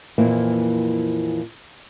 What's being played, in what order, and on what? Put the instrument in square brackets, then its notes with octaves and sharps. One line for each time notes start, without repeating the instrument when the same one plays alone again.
[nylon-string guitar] F2 A#2 E3 A#3 C4 E4